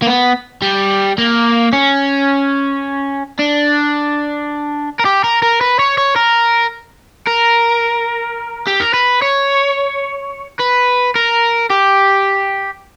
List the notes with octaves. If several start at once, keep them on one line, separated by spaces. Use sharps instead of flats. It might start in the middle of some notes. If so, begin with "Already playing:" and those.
A#3
B3
G3
A#3
C#4
D4
A#4
G4
A#4
A#4
B4
C#5
C#5
A#4
A#4
G4
A#4
B4
C#5
B4
A#4
G4